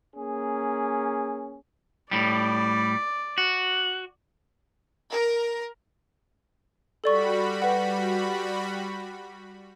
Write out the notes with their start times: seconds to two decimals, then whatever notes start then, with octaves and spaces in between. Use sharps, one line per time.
0.15 A#3 C#4 G#4
2.11 A2 G3 D5
3.38 F#4
5.10 A#4
7.04 G3 F#4 A4 D5 B5 C#6
7.62 B4 F#5